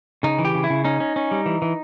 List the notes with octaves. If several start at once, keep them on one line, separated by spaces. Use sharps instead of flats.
C#3 D#4
E3
G4
C#3
E4
C#3
C#4 D#4
C#4
C#4
G3
E3
E3